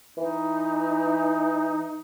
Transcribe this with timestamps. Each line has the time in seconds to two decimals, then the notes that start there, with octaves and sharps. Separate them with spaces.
0.17 E3 D#4